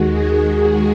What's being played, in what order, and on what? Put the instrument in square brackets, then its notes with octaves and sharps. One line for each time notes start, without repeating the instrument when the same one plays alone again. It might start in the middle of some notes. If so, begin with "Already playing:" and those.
Already playing: [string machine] D#2 D#3 G#3 F#4
G#4
G#4